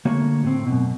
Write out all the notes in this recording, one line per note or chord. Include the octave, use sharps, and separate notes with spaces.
D3 A3 A#3 F#4 C#5
A2 C4
F#2 B2